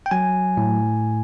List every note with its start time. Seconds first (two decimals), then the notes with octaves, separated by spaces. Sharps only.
0.06 G5
0.11 F#3 G#5
0.57 A2